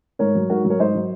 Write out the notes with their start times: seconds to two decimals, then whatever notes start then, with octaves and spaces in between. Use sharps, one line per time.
0.19 G#2 A#4 C#5
0.35 F#3
0.50 G#2 F#4 A#4
0.65 F#3
0.70 A#4 C#5
0.79 G#2 C5 D#5
0.95 F#3